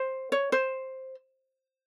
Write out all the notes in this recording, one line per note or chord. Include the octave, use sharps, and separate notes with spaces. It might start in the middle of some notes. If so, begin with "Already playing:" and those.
Already playing: C5
C#5
C5